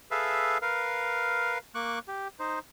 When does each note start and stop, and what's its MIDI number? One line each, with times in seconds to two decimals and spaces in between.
0.11 0.58 68
0.11 0.58 69
0.11 0.58 71
0.11 0.58 76
0.11 0.58 77
0.62 1.58 70
0.62 1.58 71
0.62 1.58 77
1.75 1.99 58
1.75 1.99 85
1.75 1.99 86
1.75 1.99 90
2.08 2.28 67
2.40 2.59 63
2.40 2.59 72